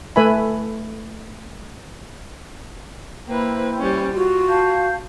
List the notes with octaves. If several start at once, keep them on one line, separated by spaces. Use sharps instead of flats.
A3 A4 B4 E5 G#5 B5
A#3 E4 B4 C5 G5
G3 C#4
F4 F#4
F5 A5 G6